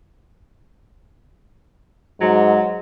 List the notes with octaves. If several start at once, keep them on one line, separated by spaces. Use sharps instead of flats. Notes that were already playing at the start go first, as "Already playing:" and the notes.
G#2 F#3